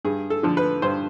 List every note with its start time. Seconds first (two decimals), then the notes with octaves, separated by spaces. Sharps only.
0.05 G2 G#4
0.30 A4
0.43 D3 F3
0.57 B4
0.82 G2 C5